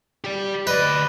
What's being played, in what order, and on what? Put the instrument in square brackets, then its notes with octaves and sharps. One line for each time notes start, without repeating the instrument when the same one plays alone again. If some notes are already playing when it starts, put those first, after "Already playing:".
[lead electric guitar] G4 D5
[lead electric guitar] D2 D#5 [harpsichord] B4 [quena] D5